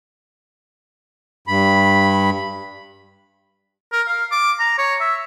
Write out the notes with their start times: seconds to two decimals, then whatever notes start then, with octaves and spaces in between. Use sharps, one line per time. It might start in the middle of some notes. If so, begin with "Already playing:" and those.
1.48 G2 B5
3.92 A#4
4.08 F5
4.31 D6
4.60 A#5
4.78 C#5
5.00 E5